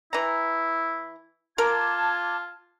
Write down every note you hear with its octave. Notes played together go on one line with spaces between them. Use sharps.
E3 E4 A#5
F4 A#4 A5 D6 G#6